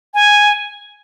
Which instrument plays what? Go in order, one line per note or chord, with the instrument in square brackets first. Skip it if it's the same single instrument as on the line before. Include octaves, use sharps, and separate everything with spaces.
[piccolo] G#5